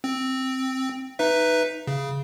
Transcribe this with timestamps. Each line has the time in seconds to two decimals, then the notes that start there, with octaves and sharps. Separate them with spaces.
0.04 C4
1.19 D#4 B4 E5
1.87 C#3